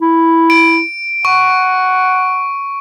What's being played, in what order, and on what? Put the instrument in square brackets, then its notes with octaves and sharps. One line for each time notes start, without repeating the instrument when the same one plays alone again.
[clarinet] E4
[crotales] D7
[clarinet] F#5 [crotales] C#6